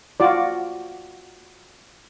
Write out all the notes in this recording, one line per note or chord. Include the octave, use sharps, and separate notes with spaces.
F4 F#4 D5